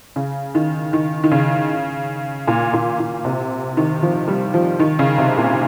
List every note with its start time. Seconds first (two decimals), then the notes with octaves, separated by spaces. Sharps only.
0.16 C#3
0.55 D#3
0.93 D#3
1.24 D#3
1.31 C#3
2.47 A#2
2.73 A#2
2.99 A#2
3.25 C3
3.77 D#3
4.02 F3
4.28 G3
4.54 F3
4.80 D#3
4.99 C#3
5.18 C3
5.38 A#2